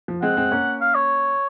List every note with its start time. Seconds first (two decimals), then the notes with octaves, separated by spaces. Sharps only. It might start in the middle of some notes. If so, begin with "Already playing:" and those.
0.08 F3
0.22 G#3 C4 F#5
0.37 G#3 C4
0.51 A#3 C#4
0.81 F5
0.95 C#5